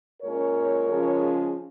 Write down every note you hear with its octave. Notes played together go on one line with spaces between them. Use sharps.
A#2 G#3 C#4 A#4 C#5
C#3 F3 G#3 C#4